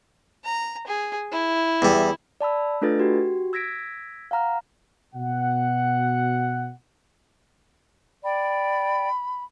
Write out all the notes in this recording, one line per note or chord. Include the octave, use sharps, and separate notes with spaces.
A#5
G#4
E4
E2 G3
D5 A5 B5 E6
A3 D4 F4 A4 B4 A6
F#4 G4
E6 G#6 A#6 B6 D7
F5 F#5 A#5 F6
B2 F#5
D5 G5 B5